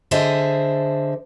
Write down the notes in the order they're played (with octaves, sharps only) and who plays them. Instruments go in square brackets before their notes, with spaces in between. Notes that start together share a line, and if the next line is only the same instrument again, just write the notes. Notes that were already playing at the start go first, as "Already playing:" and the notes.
[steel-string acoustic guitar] D3 G#4 C5 D#5 E5 A5